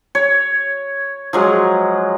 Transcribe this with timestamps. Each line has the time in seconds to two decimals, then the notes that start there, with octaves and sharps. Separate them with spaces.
0.15 C#5
1.33 F3 F#3 G#3